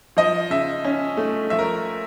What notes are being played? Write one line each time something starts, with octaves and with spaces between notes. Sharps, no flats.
F3 D#5
C#3 E5
C#4
A3
F3 E5
A#4